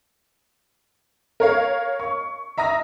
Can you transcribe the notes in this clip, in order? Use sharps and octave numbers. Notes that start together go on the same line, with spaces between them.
A#4 C#5 F5
C#6
E5 A#5 D#6 A#6